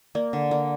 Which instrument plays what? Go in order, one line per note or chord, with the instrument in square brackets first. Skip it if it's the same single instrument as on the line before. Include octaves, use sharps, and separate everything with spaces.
[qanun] A#3 [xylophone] D5
[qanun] D3
[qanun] A#3 [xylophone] D5